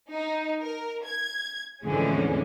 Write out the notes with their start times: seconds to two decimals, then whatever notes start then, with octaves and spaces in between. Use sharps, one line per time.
0.11 D#4
0.62 A#4
1.05 G#6
1.83 F2 A2 D3 E3 G#3 C#4